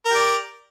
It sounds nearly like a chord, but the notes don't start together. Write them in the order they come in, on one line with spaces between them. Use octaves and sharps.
A#4 G4 D5